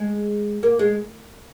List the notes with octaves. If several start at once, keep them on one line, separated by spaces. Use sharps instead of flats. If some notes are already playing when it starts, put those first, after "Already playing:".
Already playing: G#3
A#3
G#3